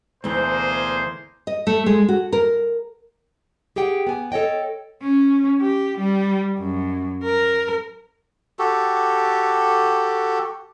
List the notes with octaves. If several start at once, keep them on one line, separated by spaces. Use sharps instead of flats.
D2 B2 E3 A#3 G#4 C5
D#5
A3
G#3
F#4
A#4
G4 G#4 F#5 G5
B3 G#5
A4 C#5 D#5 G5
C#4
G4
G3
F#2
A#4
F#4 G4 A4